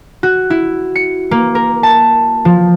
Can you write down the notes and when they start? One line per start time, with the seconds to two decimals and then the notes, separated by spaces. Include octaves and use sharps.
0.23 F#4
0.50 E4
0.95 C#7
1.31 A#3
1.55 A#4
1.83 A5
2.45 F3